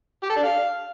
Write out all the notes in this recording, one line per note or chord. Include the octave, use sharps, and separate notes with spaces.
G4
A4
D4
F5